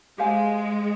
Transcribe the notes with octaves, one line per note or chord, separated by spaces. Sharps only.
G#3 G4 C5 F5 G#5